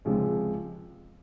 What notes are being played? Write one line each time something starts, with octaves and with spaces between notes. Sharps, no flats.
C#2 C3 F3 G#3 C#4